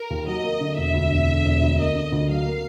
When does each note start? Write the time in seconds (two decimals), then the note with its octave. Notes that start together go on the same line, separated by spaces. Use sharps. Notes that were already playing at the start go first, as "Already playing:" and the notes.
Already playing: A#4
0.10 D#2
0.27 F#3 D#5
0.43 A#3
0.60 D3
0.77 E1 E5
0.94 D2
1.11 E1
1.28 D3
1.45 E1
1.61 D2
1.78 A#3 D#5
1.95 D3
2.12 D2
2.29 F#3 F5
2.46 A#3